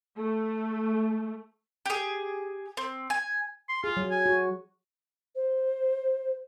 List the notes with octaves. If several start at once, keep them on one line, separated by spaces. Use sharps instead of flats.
A3
G4 G#4
C4
G#5
C6
F4 G#4
F#3
G#5
F#4
C5